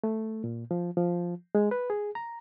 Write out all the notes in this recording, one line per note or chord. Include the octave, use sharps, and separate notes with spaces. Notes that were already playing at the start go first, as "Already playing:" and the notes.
A3
A#2
F3
F3
G#3
B4
G#4
A#5